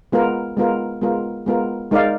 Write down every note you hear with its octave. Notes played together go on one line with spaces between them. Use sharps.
G#3 B3 F4 A#4
G#3 B3 F4 A#4
G#3 B3 F4 A#4
G#3 B3 F4 A#4
G#3 D#4 A#4 D5 F5